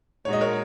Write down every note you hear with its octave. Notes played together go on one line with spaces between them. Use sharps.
A#2 G#3 D#4 F#4 C#5
D#5
A#4 C#5